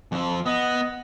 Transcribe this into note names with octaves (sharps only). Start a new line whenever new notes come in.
F2 F3
B3 D#5